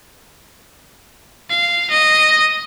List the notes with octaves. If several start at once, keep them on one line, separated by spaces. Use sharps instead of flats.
F5
D#5